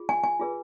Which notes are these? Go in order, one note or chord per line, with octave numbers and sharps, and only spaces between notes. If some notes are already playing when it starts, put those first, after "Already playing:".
Already playing: F4 G#4
G#5
G#5
F4 G#4 B4